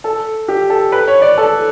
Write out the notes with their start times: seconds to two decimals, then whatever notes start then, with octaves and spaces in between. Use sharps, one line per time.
0.04 A4
0.48 G4
0.70 A4
0.92 B4
1.08 C#5
1.22 D5
1.38 A4